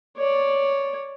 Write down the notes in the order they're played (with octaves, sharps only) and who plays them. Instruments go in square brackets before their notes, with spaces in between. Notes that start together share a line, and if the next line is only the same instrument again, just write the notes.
[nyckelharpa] C#5 D5